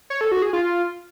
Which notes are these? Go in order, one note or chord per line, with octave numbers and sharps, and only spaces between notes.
C#5
A4
F#4
G#4
F4